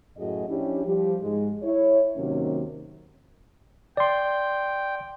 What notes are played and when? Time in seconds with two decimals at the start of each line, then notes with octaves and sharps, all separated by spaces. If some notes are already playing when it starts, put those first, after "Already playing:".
0.18 F#2 A2 F#4 G#4 D#5
0.48 F3 C#4 D4 E4 G4
0.85 F3 G3 G4
1.21 G#2 G#3
1.63 E4 C#5
2.16 D#2 C3 D#3 F#3 A#3 C#4
3.97 D5 G5 C6